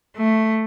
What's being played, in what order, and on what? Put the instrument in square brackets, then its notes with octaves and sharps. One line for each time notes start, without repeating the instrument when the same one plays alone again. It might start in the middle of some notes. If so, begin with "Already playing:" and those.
[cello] A3